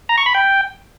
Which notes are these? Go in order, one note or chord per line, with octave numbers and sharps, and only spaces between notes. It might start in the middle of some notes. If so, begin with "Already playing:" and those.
A#5
C#6
B5
G5